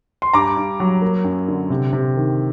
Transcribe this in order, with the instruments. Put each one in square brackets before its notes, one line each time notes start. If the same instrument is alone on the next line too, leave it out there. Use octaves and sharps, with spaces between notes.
[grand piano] C6
G2 A#5 D6
G2
F#3
A#3
F#2
D3
C3
C3
D#3